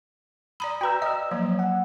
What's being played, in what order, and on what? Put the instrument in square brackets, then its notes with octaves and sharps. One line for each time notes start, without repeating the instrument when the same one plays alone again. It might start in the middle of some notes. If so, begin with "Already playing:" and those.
[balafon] D5 A#5 B5 [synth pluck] D#6
[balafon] F#4 B4 [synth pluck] G5 A#5 E6
[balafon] D5 [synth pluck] D#5 E6
[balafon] F3 F#3 A#3
[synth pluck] F#5